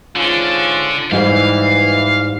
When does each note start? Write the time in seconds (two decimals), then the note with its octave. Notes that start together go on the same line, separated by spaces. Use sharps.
0.16 G#2 D3 C#4 F4
1.12 G#2 E3 G3 F5